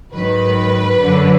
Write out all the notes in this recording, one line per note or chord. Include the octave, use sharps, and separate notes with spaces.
G#2 D#3 F#3 B4
F#2 D3 F#3